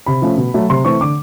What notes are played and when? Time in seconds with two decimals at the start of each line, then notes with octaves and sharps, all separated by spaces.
0.06 C3 B5
0.22 F3 A3 C#4
0.38 B2
0.54 F#3 A3
0.70 C3 C6
0.85 E3 A3 C4 C#6
1.01 D3 D6